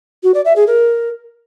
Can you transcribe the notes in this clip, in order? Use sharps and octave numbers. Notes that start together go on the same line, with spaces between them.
F#4
D5
E5
G#4
A#4